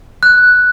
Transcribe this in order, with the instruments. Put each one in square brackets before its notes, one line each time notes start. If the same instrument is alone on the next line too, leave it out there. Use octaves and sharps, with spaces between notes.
[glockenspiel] F#6